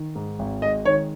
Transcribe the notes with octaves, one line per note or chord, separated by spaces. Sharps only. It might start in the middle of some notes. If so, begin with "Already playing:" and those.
Already playing: D#3
G#2
G#1
G#3 D#5
D#3 C#5